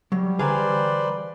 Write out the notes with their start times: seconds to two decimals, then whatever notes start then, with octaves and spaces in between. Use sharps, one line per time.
0.12 F#3 G3
0.39 D3 E3 G#4 B4 C5 D5 F5 A#5